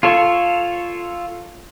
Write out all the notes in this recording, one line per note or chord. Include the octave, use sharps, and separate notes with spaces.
F4 A4 C#5